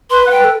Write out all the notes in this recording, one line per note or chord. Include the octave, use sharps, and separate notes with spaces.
B4 C6
F#5
B4 G5
A4